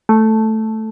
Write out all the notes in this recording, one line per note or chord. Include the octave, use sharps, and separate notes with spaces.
A3